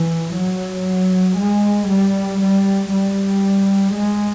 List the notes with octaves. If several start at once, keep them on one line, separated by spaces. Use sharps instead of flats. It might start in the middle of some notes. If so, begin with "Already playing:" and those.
Already playing: E3
F#3
G#3
G3
G3
G3
G#3